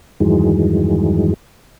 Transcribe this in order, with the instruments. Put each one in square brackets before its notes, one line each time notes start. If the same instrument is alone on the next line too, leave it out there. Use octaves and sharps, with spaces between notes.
[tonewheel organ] E2 G2 D#3 E3 F#3 G#3